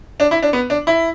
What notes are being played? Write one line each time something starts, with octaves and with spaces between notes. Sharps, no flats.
D4
E4
D4
B3
D4
E4